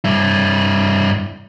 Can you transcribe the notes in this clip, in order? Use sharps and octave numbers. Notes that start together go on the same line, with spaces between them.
G2 E4